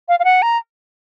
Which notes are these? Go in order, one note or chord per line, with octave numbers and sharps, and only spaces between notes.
F5
F5
F#5
A#5